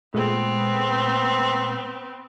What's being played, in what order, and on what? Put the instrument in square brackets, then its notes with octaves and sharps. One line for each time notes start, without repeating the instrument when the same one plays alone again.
[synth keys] A#2 G#3 A3 [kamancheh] B3 C4